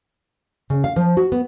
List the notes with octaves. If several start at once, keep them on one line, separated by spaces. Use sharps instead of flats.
C#3
F5
F3
F#4
B3